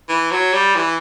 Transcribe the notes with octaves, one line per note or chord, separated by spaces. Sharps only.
E3
F#3
G3
E3